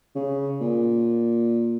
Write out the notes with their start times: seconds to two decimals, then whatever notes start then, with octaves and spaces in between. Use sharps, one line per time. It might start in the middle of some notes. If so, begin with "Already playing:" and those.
0.15 C#3
0.61 A#2